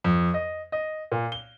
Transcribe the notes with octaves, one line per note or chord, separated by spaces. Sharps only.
F2
D#5
D#5
A#2
G7